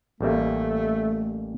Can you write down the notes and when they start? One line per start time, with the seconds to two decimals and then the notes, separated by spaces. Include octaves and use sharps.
0.21 A1 G3 A3 A#3